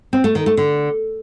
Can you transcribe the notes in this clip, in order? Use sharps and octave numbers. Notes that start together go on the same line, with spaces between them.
C4
A3
D#3
A3
D3